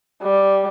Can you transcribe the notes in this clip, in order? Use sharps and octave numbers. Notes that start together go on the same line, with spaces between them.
G3